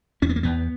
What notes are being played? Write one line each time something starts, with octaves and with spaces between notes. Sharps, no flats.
E2 C#4
B3
A#3
E2 B3